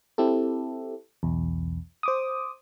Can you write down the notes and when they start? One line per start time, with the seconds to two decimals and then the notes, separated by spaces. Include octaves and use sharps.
0.18 C4 E4 G4 A4
1.23 B1 E2
2.03 C5 D6 D#6